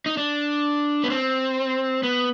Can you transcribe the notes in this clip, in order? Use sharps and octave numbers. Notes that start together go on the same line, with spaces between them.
D#4
D4
B3
C4
B3